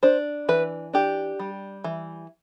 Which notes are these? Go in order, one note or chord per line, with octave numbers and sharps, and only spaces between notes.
D4 C5
E3 B4
D4 G4
G3
E3